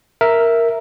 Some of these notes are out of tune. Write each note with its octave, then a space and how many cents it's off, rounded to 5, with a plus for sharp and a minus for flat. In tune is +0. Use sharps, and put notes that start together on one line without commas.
A#4 +0 E5 +0